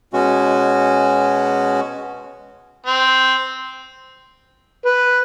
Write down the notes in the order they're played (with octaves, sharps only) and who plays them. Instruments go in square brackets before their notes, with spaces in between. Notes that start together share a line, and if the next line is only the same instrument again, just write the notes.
[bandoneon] B2 G#3 C#4 F#4
[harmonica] C4
B4